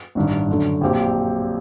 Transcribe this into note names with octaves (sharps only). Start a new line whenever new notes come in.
A1 G2 D#3
F#2 D3 A3
A#1 A#2 F#3 C4 G4